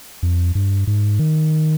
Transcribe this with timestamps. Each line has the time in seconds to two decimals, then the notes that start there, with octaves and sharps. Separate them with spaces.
0.23 F2
0.55 G2
0.87 G#2
1.19 D#3